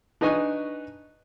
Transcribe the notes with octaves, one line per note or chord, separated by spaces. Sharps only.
D4 D#4 B4 D#5 G#5 C#6